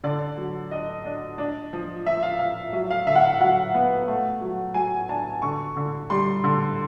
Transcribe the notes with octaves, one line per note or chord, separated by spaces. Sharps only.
D3 D5
F#3
D4 D#5
D4
D4
F3
F3 E5
F5
F3 F5
F#3 E5
F5
D3 E5
F#5
F5
F#3 F#5
B3
A3
F#3
F#3 G#5
D4 A5
D3 C#6
D3
G3 C6
D3